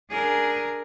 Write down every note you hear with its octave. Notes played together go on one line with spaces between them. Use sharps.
D4 G#4 A#4